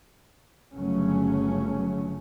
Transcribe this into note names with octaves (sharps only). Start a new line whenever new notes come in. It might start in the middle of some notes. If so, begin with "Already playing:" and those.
G1 C#3 F#3 A3 C#4